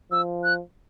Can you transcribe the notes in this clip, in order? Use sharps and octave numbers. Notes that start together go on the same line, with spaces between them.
F3 E6
F#6